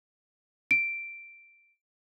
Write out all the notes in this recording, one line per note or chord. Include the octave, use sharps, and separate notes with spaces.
D7